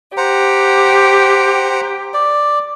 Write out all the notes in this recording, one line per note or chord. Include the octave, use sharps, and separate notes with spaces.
G4 C5 F#5 A#5
D5